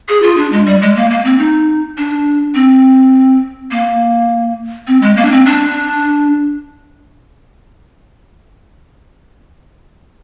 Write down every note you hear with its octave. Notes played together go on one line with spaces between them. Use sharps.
G#4
F4
D4
G#3
G3
G#3
A#3
A#3
C4
D#4
D4
C4
A#3
C4
G#3
A#3
D4
C4
D4